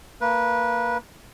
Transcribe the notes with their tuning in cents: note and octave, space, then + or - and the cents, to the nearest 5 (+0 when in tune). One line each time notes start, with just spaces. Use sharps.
A#3 -15 B4 -20